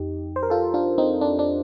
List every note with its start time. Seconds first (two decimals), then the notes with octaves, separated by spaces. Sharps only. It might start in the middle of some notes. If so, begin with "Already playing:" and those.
Already playing: F2 D#4 G4
0.36 C5
0.43 A#4
0.50 F4 A4
0.74 D4 F4
0.98 C4 D#4
1.21 D4
1.39 D4